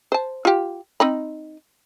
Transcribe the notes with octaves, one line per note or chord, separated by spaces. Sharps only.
C5 A5
F4 G4
C4 D#4 B5